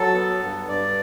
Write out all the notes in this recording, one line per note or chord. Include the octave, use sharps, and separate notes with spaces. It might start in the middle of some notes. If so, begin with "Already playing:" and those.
Already playing: F#3 A4
B3
G2
G2 D5